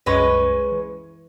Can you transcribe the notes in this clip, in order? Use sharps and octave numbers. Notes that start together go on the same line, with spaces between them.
C2 F#2 G#3 C#4 B4
E3